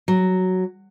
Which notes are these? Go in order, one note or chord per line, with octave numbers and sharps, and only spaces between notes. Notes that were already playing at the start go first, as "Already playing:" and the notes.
F#3